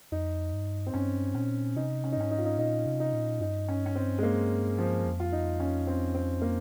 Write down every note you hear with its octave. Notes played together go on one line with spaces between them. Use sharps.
F2 D#4
G2
C4
G2 C#4
A#2 C#4
C3 D#4
C#4
D#4
G#2 C#4
D#4
F4
D#4
A#2 D#4
C3
D#4
A#2
G2 D#4
C#4
C#4
C4
G#3
A#3
F3
F2
F4
D#4
C#4
C4
C4
A#3